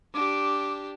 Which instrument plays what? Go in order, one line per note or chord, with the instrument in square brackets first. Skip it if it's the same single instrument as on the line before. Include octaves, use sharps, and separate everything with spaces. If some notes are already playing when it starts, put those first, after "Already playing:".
[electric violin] D4 G4 [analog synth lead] D6